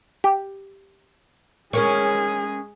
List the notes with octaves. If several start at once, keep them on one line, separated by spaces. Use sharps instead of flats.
G4
G#3 C#4 G#4 A#4 C#5